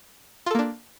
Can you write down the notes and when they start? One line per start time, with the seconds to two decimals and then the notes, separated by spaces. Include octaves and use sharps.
0.46 F4
0.51 A4
0.55 A#3
0.59 D4